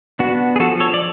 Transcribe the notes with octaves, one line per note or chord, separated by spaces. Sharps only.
B3 D4 F#4
G#4
F3 F#4 A4
A4 C#5
D5